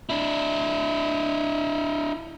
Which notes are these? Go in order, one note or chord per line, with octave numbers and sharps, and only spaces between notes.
D4 E4